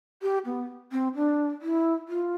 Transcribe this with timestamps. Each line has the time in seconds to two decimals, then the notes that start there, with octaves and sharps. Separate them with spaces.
0.22 G4
0.45 B3
0.92 C4
1.15 D4
1.62 E4
2.08 F4